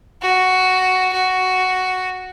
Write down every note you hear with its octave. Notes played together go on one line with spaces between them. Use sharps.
F#4
F#4